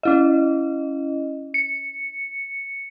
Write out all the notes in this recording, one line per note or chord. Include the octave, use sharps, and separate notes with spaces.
C#4 E4 D#5
C#7